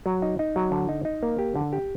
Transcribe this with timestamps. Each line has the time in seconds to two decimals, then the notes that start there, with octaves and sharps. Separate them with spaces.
0.06 F#3
0.22 D#4
0.39 D#4
0.56 F#3
0.72 D3
0.89 D#4
1.05 D#4
1.23 A#3
1.38 G4
1.56 D3
1.73 G4